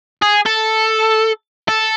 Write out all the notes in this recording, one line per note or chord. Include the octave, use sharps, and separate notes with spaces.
G#4
A4
A4